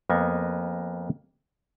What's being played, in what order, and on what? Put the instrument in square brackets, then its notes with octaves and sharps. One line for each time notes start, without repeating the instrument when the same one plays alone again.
[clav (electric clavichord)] F2 A#3 B3 D#5 G#5